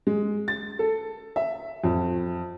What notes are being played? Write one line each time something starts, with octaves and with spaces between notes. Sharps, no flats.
G#3
A6
A4
E5
F2